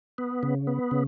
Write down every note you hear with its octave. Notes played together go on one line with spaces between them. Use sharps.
B3
C#3
B3
C#3